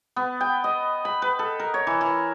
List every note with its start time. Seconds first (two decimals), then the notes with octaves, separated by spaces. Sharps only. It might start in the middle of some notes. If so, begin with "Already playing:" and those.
0.16 B3
0.41 G5
0.64 D#5
1.05 B5
1.22 B4
1.39 A4
1.60 A#4
1.74 C#5
1.87 E3
2.01 E3